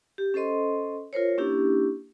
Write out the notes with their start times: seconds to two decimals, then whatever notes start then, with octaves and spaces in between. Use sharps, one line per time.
0.18 G4
0.34 C#4 A4 C5 D#5 C6
1.13 F4 A#4 C5 C#5
1.38 A#3 C#4 D4 E4 G4